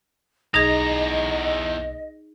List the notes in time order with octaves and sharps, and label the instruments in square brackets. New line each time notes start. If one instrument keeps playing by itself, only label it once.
[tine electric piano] B1 A#6 [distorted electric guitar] E2 A#5 [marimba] D#4 G#4 [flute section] D#5